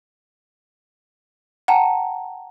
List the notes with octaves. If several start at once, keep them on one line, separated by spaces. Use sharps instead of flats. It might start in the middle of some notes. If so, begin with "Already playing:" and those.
F#5 G5 A5 A#5